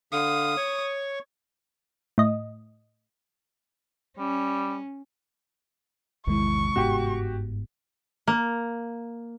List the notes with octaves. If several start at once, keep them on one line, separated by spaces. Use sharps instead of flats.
D3 F5 D#6
C#5 C#6
A2 D#5
G3 C#4
A#1 E2 C3 D#3 G#3 E4 C#6
G1 G#2 B3 F#4 G4
A#3